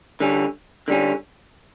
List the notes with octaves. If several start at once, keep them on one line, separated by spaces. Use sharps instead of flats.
D3 G3 C#4
D3 G3 C#4